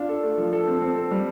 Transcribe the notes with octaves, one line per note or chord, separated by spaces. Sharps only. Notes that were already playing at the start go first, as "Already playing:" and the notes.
Already playing: D4 F4
A4
A3
F3
A4
C4
C4
A4
G3